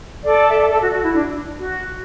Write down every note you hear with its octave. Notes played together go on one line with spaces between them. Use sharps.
A4 D5
E5
A4 D5
A4
F#4
F#4
E4
D4
F#4